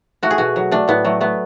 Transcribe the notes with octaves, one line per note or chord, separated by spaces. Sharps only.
A3 F#4
G#4
B2 F#4
F#3
A3 D4
A2 B3
F#3 A3
A3 B3